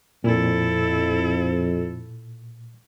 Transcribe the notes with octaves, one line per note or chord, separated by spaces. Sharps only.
F2 A#2 E4 A4